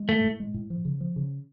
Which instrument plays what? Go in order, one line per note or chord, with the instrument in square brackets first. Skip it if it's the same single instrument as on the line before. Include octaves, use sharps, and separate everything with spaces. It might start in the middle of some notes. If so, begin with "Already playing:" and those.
Already playing: [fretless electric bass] G#3
[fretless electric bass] A2 [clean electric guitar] A3
[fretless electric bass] A2
G#3
A2
F3
C#3
F3
C#3